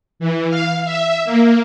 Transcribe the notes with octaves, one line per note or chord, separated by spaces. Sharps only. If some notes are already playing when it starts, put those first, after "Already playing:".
E3
F5
E5
A#3